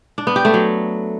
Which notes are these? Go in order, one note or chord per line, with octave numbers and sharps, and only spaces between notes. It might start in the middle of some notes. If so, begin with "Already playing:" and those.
D4
B3
G4
A3
F#3